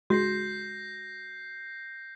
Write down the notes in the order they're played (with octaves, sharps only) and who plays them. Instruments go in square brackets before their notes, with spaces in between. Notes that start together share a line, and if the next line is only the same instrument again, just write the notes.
[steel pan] G#3 [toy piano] F#4 [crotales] G6 A#6 C7